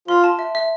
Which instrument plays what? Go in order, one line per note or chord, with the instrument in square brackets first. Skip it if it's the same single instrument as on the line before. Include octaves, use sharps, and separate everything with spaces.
[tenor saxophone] F4 [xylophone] C6
[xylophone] A5
E5
E5